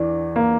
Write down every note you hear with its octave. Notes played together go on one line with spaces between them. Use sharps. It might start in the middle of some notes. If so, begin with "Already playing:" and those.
Already playing: E2 E3 D4
A#3